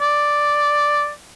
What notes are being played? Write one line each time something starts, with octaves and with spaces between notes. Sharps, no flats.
D5